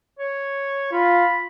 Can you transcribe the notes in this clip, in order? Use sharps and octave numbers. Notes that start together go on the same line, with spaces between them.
C#5
F4 B5